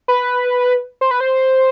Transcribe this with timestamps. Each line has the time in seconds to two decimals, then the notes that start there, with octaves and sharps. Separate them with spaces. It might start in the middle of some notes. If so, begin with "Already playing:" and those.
0.08 B4
1.01 C5
1.11 B4
1.20 C5